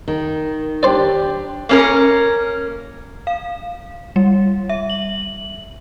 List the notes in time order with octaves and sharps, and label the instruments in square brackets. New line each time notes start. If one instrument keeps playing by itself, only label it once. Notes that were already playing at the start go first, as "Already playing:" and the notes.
[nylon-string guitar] D#3
[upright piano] D4 G4 [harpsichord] C5 D5
[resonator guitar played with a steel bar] A#3 C#4 A#4
[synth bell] F5
G3
E5
F#7